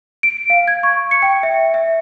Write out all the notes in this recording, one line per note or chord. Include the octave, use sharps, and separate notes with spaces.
D7
F5
G#6
C#6
C#7
G5
E5
E5